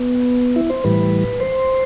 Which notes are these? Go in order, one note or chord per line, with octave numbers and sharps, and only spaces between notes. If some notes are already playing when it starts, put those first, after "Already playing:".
Already playing: B3
E4
C5
A2 E3 G3 B4
C5